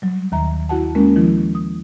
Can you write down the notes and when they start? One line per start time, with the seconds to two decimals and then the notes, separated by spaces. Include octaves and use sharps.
0.02 F#3 G3
0.32 D#2 D#3 E5 A#5
0.69 E4 F#4 F#5 A5
0.95 G#3 A#3 C#4 A#4
1.16 D#3 F3 E4
1.55 D#6